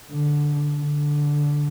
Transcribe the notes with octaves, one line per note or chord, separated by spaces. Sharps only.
D3
D3